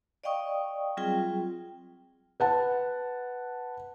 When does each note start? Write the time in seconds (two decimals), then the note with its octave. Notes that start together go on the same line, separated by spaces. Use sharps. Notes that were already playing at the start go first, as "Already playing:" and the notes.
0.24 D5 D#5 F5 G5 C#6 D#6
0.97 F#3 G3 C4 F4 G#4 G5
2.40 B4 F#5 A5